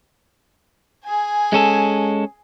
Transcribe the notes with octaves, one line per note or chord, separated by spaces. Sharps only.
G#4 G#5
G#3 C#4 A4